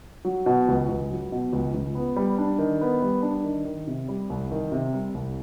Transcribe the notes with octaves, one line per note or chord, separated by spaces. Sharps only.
F#3
B2
C#2
C#2
F#3
B2
C#2
C#2
B3
G3
D4
D#3
B3
G3
D4
D#3
D#3
C3
G3
C2
D#3
C3
G3
C2